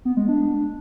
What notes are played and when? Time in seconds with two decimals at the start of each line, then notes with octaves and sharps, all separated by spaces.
0.05 B3
0.17 G#3
0.28 D4